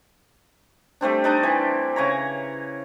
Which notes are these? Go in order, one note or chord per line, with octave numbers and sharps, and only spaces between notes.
G3 A3 C4 D4
D4 D#4 D5 D#5
E3
C#3 C#5 A#5